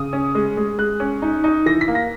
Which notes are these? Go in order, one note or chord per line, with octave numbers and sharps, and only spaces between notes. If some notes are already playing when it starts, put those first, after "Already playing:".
Already playing: C#3 D#6
C#4
G#3
G#3
G#3 F#6
C#4
D#4
D#4
E3 A#6
B6
A#3
A#6